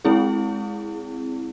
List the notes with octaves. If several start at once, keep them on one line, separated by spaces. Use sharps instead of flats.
G#3 C4 E4 G#4